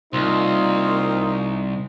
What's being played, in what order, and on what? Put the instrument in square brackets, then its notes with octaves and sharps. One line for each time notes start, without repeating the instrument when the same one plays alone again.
[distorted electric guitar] C2 [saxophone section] A#3 F4 [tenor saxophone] C4 [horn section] D#4